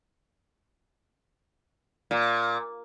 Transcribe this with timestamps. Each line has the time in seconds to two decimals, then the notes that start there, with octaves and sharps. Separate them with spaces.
2.11 A#2